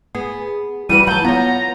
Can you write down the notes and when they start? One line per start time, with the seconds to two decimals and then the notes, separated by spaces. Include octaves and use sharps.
0.15 B3 G#4
0.89 E3 G3 F#4 B4 D#7
1.07 F#3 F#5 A5 G6
1.25 B3 F4 C#5 A#5